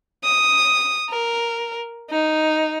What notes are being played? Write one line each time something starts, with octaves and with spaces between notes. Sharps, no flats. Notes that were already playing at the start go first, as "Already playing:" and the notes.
D#6
A#4
D#4